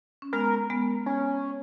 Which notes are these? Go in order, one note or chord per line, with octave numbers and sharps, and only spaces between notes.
C#4
G#3 B3 A#4
G#3 B3
C#4